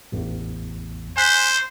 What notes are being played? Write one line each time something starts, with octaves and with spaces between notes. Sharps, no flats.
A1 E2
C5 G#5 F#6 B6